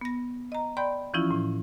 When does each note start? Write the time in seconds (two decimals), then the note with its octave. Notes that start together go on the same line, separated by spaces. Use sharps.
0.01 B3 A#6
0.52 D#5 A#5
0.77 D5 G5 B5 C6 G6
1.14 E3 F3 C#4 E4 F4
1.31 A2